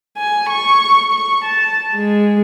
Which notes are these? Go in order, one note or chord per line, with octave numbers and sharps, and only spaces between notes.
G#5
C#6
C#6
A5
G#3